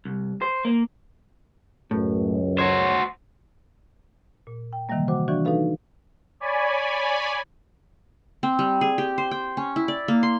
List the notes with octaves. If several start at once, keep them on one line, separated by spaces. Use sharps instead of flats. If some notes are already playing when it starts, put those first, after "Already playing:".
C2
C5
A#3
C#2 F#2 A2
F#4 C5 C#5
A#2
G5
C3 D#3 E3 F#3 G3 A#3
F#4 C5 F#5 D6
E3 F3 D4 F#4 D5 C#6
D#4 F#4 G4 A4 B4 F5
C#5 D5 G#5 B5
C4
G3
G#4
G4
C5
G5
C#4
E4
D5
A#3
C6